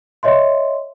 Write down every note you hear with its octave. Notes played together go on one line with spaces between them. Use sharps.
C#5 D#5 E5 C6